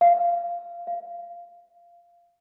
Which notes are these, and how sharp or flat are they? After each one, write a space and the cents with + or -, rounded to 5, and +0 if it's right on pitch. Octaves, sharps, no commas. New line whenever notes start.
F5 -10
F5 -10